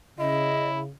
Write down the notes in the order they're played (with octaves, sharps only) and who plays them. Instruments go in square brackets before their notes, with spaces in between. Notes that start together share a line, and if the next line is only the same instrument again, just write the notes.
[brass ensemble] C#3 [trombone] E4 [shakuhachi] D#5